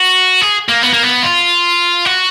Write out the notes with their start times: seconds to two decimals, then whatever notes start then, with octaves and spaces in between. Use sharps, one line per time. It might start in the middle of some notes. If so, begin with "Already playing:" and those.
Already playing: F#4
0.41 G#4
0.69 A#3
0.82 B3
0.93 A#3
1.03 B3
1.23 F4
2.06 F#4